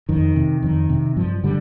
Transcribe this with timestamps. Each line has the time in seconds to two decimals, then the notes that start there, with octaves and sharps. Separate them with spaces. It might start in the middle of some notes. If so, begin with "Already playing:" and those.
0.09 F2 D#3
0.36 C3
0.63 F2 D#3
0.89 C3
1.16 G2 F3
1.44 D3 G3